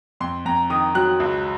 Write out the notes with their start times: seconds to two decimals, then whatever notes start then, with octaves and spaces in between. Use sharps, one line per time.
0.20 F2 C6
0.45 F2 A#5
0.70 D#3 D#6
0.95 F#3 F#6
1.20 C#2